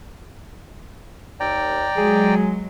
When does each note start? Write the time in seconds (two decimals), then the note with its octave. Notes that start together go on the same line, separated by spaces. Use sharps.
1.40 D#2 D5 G5 A#5
1.96 F#3 G#3 G#4